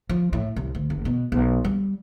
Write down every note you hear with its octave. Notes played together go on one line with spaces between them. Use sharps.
F3
A2
C2
D2
F#1
B2
B1
G3